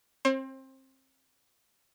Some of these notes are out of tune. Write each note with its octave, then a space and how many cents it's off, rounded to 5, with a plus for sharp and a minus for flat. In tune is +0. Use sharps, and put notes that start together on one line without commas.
C4 +25 C5 +40